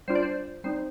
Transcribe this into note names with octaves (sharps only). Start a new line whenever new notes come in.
G3 D4 F4 C5
D5
C5
G3 C4 D#4 C5